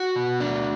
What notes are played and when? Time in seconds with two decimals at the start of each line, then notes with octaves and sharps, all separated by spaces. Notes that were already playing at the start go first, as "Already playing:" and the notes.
Already playing: F#4
0.16 B2
0.40 D4